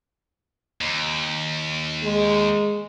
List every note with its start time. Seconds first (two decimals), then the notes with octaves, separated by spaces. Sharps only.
0.81 D#2
2.04 G#3